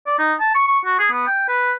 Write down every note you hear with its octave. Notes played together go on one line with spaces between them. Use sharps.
D5
D#4
A5
C#6
C#6
F#4
G#4
B3
G5
B4